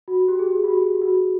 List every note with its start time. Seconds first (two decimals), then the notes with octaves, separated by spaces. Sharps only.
0.08 F#4
0.28 G4
0.39 G#4
0.50 G4
0.64 F#4
0.70 G4
1.02 F#4